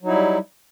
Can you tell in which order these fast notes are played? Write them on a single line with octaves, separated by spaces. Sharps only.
F#3 D#4 E4 G3